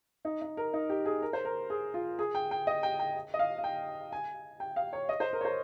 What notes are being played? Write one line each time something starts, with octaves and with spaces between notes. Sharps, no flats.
D#4
D#4
A#4
D#4
G4
G#4
A#4
C5
A#4
G#4
F4
G#4
G5
G5
D#5
G5
G5
D#5
F5
F5
G5
G#5
G5
F5
C#5
D#5
C5
A#4
C#5
C5